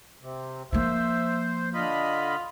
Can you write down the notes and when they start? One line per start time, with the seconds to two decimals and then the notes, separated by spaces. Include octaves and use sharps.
0.22 C3
0.73 F3 A#3 C5 E5
1.74 D3 F4 D#5 B5